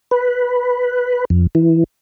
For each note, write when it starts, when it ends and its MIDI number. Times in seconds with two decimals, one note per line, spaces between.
0.11 1.25 71
1.30 1.47 41
1.55 1.84 52